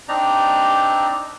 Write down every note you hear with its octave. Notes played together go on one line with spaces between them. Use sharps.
C4 D4 D#4 D5 A#5